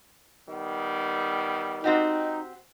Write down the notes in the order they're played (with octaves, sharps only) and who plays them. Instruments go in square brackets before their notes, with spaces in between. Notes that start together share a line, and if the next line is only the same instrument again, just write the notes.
[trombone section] D#3 G3 B3
[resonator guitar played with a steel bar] C4 F#4 G4 [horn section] D#4